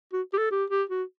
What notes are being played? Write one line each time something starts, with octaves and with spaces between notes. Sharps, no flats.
F#4
G4
A4
G4
G4
F#4